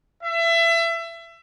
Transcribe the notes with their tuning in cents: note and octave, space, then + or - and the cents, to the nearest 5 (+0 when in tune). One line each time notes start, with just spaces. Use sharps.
E5 +25